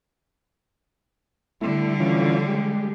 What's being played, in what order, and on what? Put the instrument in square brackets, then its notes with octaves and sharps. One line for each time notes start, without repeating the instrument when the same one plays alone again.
[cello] D3 G3 [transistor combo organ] A3 E4
[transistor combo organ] E3 C#4 F4
G#3 G4